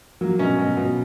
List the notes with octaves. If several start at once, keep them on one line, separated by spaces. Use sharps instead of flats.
F#3 A#3
B2 C#4
B2
B2